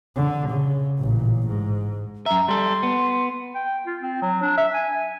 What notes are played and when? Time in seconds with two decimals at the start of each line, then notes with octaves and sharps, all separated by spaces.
0.16 D3
0.50 C#3
0.99 A1 A#2
1.47 G#2
2.26 F#2 E5 A#5
2.48 G3 A4 C6
2.83 B3
3.55 G5
3.86 F4
4.02 C4
4.22 F#3
4.42 D4
4.58 E5
4.74 G#5